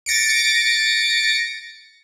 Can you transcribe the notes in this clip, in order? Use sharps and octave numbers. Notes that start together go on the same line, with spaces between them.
A6 A#6 C#7 D7